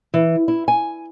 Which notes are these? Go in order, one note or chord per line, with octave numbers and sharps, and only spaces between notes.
E3
E4
G#5